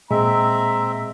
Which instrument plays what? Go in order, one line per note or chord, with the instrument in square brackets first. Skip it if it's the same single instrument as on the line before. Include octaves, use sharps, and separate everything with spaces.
[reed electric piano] A#2 [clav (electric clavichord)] G#3 [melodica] C4 E5 [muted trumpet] A#5